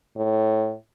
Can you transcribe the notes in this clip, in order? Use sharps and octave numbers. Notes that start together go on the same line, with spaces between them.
A2